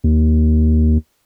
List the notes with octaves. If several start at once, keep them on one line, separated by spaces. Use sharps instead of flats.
D#2